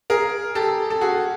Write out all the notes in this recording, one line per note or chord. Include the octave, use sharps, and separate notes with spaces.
G#4 A#4
G4 A4
A4
F#4 G#4